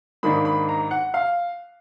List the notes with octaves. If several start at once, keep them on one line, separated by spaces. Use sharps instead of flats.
G#2 D#3 A#3 D4 B5
B5
A#5
F#5
F5